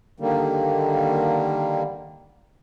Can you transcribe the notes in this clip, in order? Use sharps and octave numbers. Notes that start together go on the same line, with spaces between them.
D3 D#3 G3 A#3